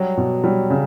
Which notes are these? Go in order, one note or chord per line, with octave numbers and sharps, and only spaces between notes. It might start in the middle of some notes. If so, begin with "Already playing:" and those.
Already playing: F#3 G3
B2
F#3 G3
C#3